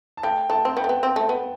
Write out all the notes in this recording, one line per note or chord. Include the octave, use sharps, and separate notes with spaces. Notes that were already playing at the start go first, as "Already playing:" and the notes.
A5
A3 G5
A3 A5
C4
B3 G5
A3
B3
C4
A3
B3